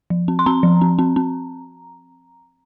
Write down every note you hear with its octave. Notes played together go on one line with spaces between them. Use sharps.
F3
C4
C6
C4 A#5
F3
C4
C4
C4